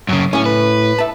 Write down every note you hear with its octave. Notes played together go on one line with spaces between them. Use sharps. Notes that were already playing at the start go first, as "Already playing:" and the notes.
F#2 C#3
A2 C#4 G#5
B4
E5 A5